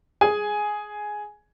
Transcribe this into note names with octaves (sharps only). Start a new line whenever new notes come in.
G#4 G#5